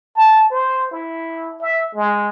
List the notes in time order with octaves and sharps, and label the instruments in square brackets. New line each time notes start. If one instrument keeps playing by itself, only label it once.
[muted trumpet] A5
C5
E4
E5
G#3